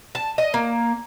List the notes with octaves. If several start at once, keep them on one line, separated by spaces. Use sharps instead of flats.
A5
D#5
A#3